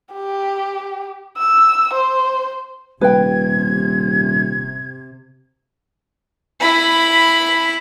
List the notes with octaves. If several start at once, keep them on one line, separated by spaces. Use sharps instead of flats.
G4
E6
C5
D#1 C3 B4 G5 G#6
E4 B5